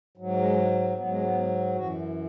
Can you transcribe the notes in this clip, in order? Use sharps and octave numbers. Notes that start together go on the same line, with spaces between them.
G#2 F#3
G#3
G#2 F#3 B3
G#3
B3
F#2 E3 F#4